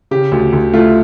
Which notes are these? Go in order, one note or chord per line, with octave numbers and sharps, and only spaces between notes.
C#3 G4
D2
D2
A3 F4